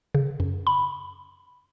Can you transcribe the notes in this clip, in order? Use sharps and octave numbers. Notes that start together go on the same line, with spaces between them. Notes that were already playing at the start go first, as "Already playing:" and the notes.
C#3
F#2
B5